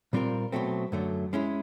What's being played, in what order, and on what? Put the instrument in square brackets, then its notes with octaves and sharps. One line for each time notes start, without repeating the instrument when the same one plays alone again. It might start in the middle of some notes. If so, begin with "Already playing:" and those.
[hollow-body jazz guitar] A#2 G3 C4 F4 A#4
B2 F#3 A3 C4
F#2 D3 F#3 A3
G#3 C#4 E4